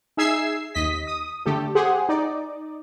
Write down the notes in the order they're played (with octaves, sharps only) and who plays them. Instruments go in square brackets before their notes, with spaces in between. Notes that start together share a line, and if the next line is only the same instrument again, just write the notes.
[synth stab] D#4 G#4 E5 E6 G#6 C7
D#2 D#5 B6
D#6
D3 A3 G4 A4
G4 G#4 C5 F#5
D#4 D5